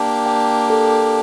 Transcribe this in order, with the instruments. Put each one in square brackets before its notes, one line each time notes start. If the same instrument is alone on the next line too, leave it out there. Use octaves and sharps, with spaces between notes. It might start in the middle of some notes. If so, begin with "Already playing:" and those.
Already playing: [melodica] A#3 D4 G4
[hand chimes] G5
A4